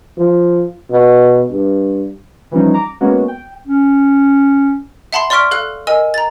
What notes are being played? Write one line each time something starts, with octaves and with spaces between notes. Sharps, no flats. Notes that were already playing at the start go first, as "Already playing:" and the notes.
F3
B2
G2
E3 F3 G3 C#4 D#4
A#5 D6
G#3 A#3 B3 C#4 F#4
G5
C#4
E5 F#5 A5 B5 C6 C7
D5 C6 C#6 F6 B6 D7
A4 F5 F#6
A#4 D#5 G#5 E6
A#5 A6